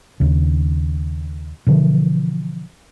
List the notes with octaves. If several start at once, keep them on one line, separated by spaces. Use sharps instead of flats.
D#2 C#3
B2 D3 E3 F3